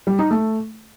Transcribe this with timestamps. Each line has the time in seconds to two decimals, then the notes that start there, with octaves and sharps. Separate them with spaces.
0.07 G3
0.19 D#4
0.31 A3